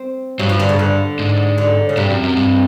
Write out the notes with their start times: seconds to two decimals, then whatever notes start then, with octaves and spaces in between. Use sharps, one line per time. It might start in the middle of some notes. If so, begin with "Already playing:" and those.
Already playing: C4
0.39 G2 F#3
0.49 F3
0.60 D3
0.69 C#3
0.79 D3
1.19 G#2
1.58 D3
1.89 C#3
1.97 G2 C3
2.10 F#2
2.23 F#2
2.37 G2